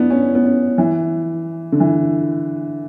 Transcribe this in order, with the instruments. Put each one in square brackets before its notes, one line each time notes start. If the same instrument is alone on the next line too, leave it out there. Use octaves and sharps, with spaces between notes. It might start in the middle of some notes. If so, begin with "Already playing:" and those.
Already playing: [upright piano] B3 D4 E4
C#4
B3
C#4
E3
D3
E3